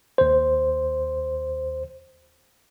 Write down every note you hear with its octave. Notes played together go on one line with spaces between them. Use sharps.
D#2 C5